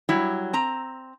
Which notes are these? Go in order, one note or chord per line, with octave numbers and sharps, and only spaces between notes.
F#3 G3 E4
C4 A#5